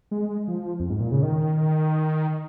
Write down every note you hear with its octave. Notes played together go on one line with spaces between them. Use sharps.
G#3
F3
F2
G#2
A#2
C#3
D#3